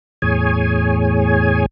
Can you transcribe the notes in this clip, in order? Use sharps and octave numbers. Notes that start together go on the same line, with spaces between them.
E2 A2 G#4 C#5 G#5